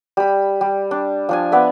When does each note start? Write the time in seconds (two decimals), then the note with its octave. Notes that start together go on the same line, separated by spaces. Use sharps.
0.17 G3 B5
0.61 G3
0.91 D4
1.29 F3 D4 G#5
1.52 B3 D5 E5